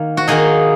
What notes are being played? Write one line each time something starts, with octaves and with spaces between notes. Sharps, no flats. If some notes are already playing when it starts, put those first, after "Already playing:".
Already playing: D#3 A#3
F#4
D#3 A#3 D#4 G#4